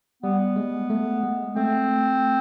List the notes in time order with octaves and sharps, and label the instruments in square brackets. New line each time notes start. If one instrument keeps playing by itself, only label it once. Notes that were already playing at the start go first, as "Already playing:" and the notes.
[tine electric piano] G3 [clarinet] B3
[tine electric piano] G#3
A3
G#3
[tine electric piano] A3 [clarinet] C4